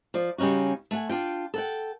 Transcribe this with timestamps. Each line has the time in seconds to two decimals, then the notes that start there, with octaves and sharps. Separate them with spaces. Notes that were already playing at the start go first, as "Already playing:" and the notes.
0.14 F3 D5
0.38 C#3 G3 C#4 D#4 F#4
0.91 A3 F#5 G#5
1.09 D4 F4 G5
1.54 A4 F#5 G5